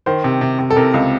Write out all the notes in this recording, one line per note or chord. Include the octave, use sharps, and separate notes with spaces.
D#3 C5
C3
C3
C3
A4
C3 A#4
C#2